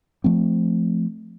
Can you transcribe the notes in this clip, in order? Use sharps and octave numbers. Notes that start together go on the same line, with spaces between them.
F3 A3 C4